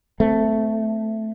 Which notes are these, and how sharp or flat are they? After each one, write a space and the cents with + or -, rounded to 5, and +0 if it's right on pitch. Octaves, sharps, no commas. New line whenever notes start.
A3 +0 C4 -20